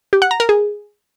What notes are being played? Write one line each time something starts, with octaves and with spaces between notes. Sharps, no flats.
G4
F#5
A#5
A#4
G#4